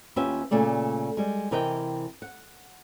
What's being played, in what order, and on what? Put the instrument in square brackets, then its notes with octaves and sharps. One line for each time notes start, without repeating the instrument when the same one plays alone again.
[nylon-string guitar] D#2 C#4 F4 G4 B4 E5
A#2 C#3 A3 D5
G3 G#3
C3 E3 A#4 D#5 G5
F#5